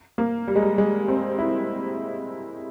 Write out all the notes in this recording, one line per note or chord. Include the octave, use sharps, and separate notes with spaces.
A#3
G3
G#3
G3
G#3
C4
E4